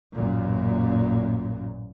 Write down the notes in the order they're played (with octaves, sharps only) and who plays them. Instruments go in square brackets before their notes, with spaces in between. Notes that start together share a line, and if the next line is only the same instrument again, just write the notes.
[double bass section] A1 F#2 A#2